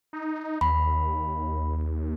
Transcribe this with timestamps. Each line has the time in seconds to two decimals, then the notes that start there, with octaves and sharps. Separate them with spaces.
0.13 D#4
0.61 D#2 B5